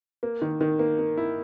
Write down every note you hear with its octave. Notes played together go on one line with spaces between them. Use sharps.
A#3
D#3
D#3
A#3
A#3
E4